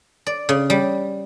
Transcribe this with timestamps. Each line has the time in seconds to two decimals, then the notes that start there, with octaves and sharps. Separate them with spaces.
0.27 D5
0.49 C#3
0.70 G3